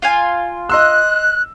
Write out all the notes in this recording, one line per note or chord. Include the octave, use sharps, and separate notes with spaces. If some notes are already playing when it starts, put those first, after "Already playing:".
F4 F5 G#5
D#5 C6 E6 F#6